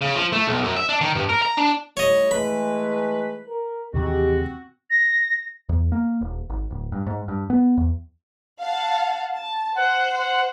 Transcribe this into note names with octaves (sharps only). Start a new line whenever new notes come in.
C#3
F3
A3
B1
F#2
E5
D4
D#3
G2
A#4
A#5
D4
G3 A3 E4 C#5 D#5
E3 G#3 A3 B4 B5
A#4
D#2 C3 E3 G#3 C4 F#4 G4
A#6
E2
A#3
D#1
G#1
D1
G2
G#2
G2
B3
E2
F5 F#5 A5
A5
C5 F#5
F#5